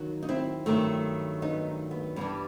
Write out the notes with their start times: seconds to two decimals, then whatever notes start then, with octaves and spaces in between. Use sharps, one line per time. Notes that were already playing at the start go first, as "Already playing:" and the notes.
Already playing: D#2 D#3 F#3 F#4
0.23 D#4
0.29 C4 E4
0.66 G2 D#3 F#3 A3 C4
1.42 B3 D#4
1.91 B3
2.16 G2 E3 G3 B3